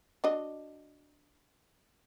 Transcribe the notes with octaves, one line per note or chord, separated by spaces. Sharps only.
D4 F#4 D#5